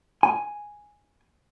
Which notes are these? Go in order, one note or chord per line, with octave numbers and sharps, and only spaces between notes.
G#5